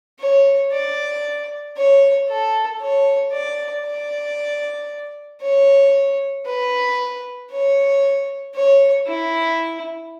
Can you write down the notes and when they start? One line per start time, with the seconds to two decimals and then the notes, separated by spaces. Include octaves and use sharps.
0.20 C#5
0.72 D5
1.77 C#5
2.29 A4
2.81 C#5
3.33 D5
3.86 D5
5.42 C#5
6.46 B4
7.51 C#5
8.55 C#5
9.07 E4